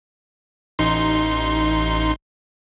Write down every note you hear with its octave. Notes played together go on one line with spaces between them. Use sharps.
A1 D#4 C6